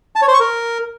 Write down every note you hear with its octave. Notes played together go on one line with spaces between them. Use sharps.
A5
C#5
C5
C#6
A#4